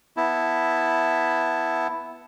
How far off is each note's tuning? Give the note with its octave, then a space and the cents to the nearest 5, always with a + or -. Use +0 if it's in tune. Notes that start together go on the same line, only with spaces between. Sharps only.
B3 +0 E4 +0 A5 +0